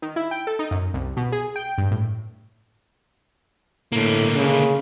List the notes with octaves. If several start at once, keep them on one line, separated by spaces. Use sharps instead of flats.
D#3
E4
G5
A4
D#4
F#2
C2
B2
G#4
G5
G2
A2
A2 D3 A#3
C#3